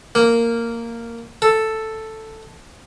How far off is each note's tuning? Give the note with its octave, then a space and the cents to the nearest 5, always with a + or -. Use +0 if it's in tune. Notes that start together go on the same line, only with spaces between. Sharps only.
A#3 -10
A4 +0